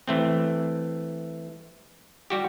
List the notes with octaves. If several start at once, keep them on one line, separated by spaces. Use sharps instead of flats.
E3 A3 C4
G3 F#4 G4